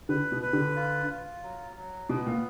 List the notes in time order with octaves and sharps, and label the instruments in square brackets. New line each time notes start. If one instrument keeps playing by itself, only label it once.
[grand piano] D3 [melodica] B4
[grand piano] B2
[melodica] B4
[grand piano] D3
[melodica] F4
F4
F#3
F#3
[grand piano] B2 [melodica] B3
[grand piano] A#2